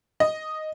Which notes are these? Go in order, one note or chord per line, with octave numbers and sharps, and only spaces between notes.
D#5